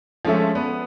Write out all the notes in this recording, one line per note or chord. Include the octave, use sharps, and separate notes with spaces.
F3 G#3 A3 C#4 A4 E5
B3 B4